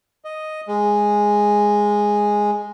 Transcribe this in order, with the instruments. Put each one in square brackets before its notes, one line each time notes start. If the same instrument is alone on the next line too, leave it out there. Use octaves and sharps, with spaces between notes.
[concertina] D#5
G#3